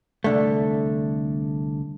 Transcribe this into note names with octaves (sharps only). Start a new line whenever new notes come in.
C2 D3 A3